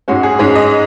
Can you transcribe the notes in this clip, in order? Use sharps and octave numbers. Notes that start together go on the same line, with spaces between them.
G#2 G#3 C#4 F#4
G#4
G#2 G#3 C#4 C#5
D#5